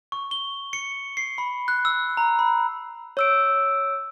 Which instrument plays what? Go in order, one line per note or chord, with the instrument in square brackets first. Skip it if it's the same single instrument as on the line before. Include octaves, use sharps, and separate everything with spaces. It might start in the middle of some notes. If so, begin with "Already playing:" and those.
[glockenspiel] C#6
G7
C#7
C7
B5
F#6
E6
A#5
B5
[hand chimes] C#5 E6 D7